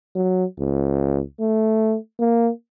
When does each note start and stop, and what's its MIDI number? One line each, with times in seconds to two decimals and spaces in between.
0.15 0.45 54
0.59 1.21 37
1.40 1.96 57
2.20 2.50 58